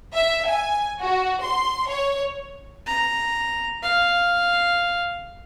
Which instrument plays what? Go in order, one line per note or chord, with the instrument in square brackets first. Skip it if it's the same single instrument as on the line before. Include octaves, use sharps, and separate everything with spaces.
[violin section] E5
G#5
F#4
C6
C#5
[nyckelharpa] A#5
F5